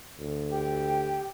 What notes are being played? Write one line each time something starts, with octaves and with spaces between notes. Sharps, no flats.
D2
G4 G5